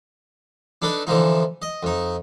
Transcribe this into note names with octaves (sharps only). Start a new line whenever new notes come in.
D4 D#4 A4 B4
D3 E3 F3 D#4
D#5
F2 D#4